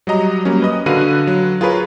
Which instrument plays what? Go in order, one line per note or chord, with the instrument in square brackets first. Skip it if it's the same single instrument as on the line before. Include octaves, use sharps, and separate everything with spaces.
[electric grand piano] F#3 G3 D#5 A#5
F#3 G3 A#3 C#4
B4 D#5 D#6
D3 F#4 B4 F5 F#6 D#7
F#3
F4 G#4 A#4 B4 C#5